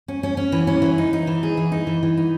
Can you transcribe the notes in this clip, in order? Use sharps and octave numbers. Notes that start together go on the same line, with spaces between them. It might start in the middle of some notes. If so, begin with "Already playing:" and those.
C#4
C#4
C#4
E3
C#4
E3
D#4
D#4
E3
G#4
E3
D#4
E3
E3
D#4